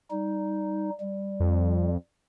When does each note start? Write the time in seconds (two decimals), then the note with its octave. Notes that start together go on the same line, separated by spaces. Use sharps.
0.11 G3 D#4
1.00 G3
1.40 F2